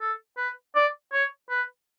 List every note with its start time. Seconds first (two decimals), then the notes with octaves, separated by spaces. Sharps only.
0.01 A4
0.37 B4
0.75 D5
1.13 C#5
1.50 B4